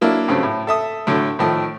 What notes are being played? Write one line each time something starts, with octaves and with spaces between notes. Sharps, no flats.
F#3 A#3 D4 E4
G2 C#3 F#3 A3 C4
A2
A4 E5 D#6
A2 D3 F#3 A3
A2 D#3 F3 A3